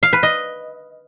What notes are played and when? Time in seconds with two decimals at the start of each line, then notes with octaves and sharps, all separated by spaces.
0.03 F5
0.13 B4
0.23 D#5